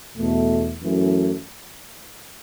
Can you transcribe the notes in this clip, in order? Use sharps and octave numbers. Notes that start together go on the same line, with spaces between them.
E2 B2 A3
F#2 E3 A3